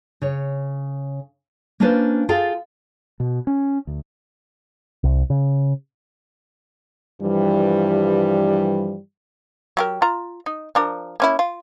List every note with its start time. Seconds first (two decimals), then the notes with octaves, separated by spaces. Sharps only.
0.22 C#3 C#5
1.80 A#3 C#4 D4 F4 B4 C5
2.29 F4 G#4 A4 F5 G5
3.20 B2
3.47 C#4
3.87 D2
5.04 C2
5.30 C#3
7.21 G2 E3 F3 G3
9.77 F#3 G4 A#4
10.02 F4 A#5
10.46 D#4
10.75 F3 D4 A#4
11.20 A#3 C#4 E4
11.39 F4